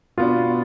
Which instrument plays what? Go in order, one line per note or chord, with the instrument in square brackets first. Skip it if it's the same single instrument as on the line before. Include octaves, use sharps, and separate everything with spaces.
[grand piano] B2 B3 D4 [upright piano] F4